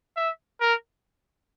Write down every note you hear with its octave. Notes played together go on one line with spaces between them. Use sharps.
E5
A#4